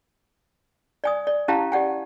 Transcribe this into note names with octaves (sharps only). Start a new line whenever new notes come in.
D5 G#5 D#6
D5
C#4 E4 G4 F5 A5 A#5
G4 D5 F#5 G#5